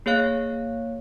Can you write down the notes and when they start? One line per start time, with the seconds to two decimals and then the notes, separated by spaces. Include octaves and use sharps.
0.06 A#3 G#4 C#5 F5 F#6